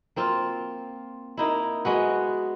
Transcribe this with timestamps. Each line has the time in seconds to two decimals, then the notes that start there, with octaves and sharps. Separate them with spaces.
0.16 A#3 C4 F4
1.37 A#3 D#4 E4
1.85 G#3 B3 F#4